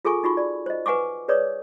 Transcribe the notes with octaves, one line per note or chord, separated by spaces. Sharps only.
F4 G#4 A4 G#5 C#6
D#4 F4 F#4 B5 C#6
D5
C5 D#5
B4 F#5 G#5 C#6 D6
G#4 B4 C#5 D5 D#6